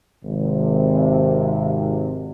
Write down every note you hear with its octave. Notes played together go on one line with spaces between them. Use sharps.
G#1 C3